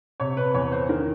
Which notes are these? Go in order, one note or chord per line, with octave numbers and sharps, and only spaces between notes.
C3 C#5
B4
E2 C#5
C5
D#3 A#4